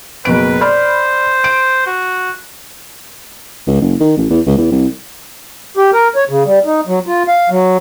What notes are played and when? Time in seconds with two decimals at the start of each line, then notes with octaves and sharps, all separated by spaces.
0.25 F#1 B2 B4 D7
0.61 C5 D5 B5 F6
1.44 D7
1.86 F#4
3.67 C#2
3.82 F#1
4.00 D#3
4.17 A1
4.30 E2
4.46 C#2
4.58 E2
4.72 C2
5.77 G4
5.93 A#4
6.16 C#5
6.29 C#3
6.45 G3
6.65 D#4
6.87 F#3
7.07 F4
7.28 F5
7.50 F#3